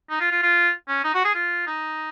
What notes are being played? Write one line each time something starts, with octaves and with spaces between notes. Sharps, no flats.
D#4
F4
F4
F4
C#4
D#4
F#4
G#4
F4
D#4